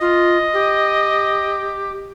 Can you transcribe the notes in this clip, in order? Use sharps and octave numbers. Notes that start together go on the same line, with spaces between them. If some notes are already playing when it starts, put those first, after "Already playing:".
F4 D#5
G4